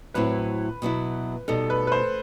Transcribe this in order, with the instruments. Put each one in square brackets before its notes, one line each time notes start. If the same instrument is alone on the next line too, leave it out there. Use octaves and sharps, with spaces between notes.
[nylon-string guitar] A2 F#3 C4 E4 [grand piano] B4
[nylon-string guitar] B2 F#3 B3 E4
[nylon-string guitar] B2 G3 D#4 [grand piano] A4
[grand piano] B4
B4
C5